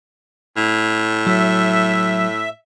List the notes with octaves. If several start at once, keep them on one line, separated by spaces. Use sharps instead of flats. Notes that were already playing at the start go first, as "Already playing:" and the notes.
A2
F#3 E5